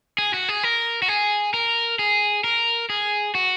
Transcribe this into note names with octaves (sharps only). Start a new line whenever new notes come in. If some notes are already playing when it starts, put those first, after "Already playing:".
G#4
F#4
G#4
A#4
F#4
G#4
A#4
G#4
A#4
G#4
F#4